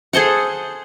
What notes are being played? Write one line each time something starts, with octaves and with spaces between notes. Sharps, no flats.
G#4 A4 C5 F#5